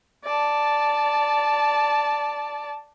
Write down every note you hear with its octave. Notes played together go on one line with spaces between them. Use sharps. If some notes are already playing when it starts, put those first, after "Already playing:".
D5 A5